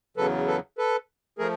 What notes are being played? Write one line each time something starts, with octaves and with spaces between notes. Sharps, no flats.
E2 C#3 F#3 A4 B4
A4 B4
A4 B4
F3 A3 G#4 A#4